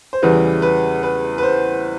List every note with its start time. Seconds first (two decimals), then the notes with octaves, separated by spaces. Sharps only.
0.13 C5
0.22 E2 C#3 E3 G3 B4
0.62 B4
1.03 B4
1.38 B4
1.43 C5